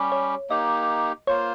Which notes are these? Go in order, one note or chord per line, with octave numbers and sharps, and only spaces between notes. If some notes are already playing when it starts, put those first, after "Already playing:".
Already playing: G3 C#4 G4
C#5
A#3 D#4 G4 D#5
A#3 F4 C5 C#5